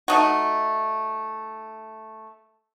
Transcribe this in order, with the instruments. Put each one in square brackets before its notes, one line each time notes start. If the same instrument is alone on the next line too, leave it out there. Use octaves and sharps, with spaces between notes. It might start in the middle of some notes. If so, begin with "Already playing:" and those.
[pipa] A3 D#4 F#4